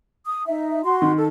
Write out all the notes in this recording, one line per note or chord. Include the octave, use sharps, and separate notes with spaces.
D#6
D#4 E5
F#4 C6
D#3
A4